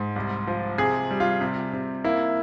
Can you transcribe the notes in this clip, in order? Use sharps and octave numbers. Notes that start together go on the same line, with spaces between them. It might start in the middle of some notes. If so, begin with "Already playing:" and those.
Already playing: G#2
C2
F3
C3 G#4
G3
F4
C3
C3
A#3 E4